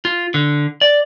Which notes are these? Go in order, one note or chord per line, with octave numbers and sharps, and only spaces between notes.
F4
D3
D5